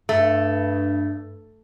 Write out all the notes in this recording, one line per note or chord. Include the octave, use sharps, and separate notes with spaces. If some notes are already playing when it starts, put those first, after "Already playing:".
G2 A3